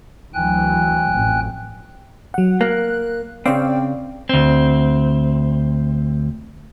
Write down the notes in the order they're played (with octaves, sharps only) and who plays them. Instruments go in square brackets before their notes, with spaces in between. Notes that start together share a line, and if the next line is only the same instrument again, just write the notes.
[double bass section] D2 E3 F#3 [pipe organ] G5 G#5 F#6
[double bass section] A1 F2
[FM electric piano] F#3 F#5
[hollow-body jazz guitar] A#3 [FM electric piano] F#6
[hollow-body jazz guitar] C#3 C4 [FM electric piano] D5 F5 G5
[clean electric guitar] D2 C4